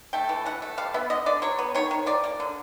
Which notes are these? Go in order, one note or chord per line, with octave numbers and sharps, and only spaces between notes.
A3 G5
E3
E3 F#5
A3
G3 F5
B3 E5
D3 D#5
D3 D5
F#3 C#5
B3
D#3 C#5
D#3
F3 D5
A#3
D3